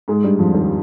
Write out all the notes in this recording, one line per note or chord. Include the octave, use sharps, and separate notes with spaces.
G#2 G#3
G2 G3
F2 F3
D#2 D#3